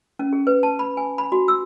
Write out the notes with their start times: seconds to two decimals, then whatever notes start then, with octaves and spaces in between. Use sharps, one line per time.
0.19 C#4
0.33 G#4
0.47 B4
0.63 A5
0.79 B5
0.97 G#5
1.18 B5
1.32 F#4
1.48 E6